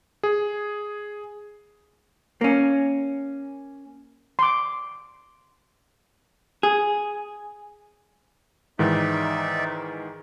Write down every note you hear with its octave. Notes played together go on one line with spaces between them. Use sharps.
G#4
A#3 C#4
C6 D6
G#4
G#2 D#3 E3 D#4 D5 E5